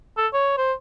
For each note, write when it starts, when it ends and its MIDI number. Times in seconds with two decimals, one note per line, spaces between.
0.17 0.27 69
0.33 0.52 73
0.58 0.73 72